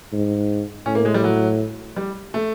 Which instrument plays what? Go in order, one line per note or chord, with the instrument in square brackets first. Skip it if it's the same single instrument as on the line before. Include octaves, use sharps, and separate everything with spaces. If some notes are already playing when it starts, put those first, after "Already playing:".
[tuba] G#2
[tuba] A2 [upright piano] C#4
[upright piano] A#3
G#3
G3
F#3
G3
A3